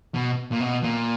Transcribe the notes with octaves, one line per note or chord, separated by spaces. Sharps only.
B2
A#2
B2
A#2